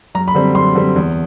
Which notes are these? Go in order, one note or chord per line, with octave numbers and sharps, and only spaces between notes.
F#2 A#5
B5
D3 G3 C4
F#2 C6
D3 G3 C4
E2